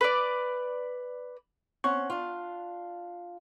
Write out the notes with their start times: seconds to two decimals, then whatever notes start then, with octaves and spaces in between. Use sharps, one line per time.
0.01 B4 D5
1.84 C4 C#4 F#5 C#6
2.10 D4 F4